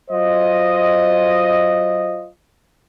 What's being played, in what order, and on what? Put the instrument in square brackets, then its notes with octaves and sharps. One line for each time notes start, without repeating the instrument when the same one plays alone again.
[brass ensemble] F#3 F4 C5 D#5